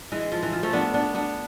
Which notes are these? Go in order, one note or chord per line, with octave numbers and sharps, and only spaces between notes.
E3 G#3
F3
E3
F3
F3 A3
B3 D4
B3 D4
B3 D4